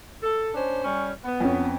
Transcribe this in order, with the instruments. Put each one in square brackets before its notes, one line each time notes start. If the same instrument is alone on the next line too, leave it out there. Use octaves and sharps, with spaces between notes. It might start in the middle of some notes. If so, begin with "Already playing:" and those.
[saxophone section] A4
C#4 D4 C5
G3 C#4
B3
[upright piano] F2 C#4